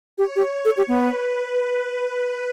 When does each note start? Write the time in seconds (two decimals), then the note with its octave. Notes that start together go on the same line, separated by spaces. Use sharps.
0.18 G4 C#5
0.36 G4
0.65 A4
0.77 G4
0.88 B3 B4